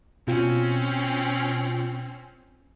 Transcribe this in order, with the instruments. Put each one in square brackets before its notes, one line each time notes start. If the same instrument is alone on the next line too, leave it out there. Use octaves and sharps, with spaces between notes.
[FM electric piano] B2 F4 [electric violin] C4 C#4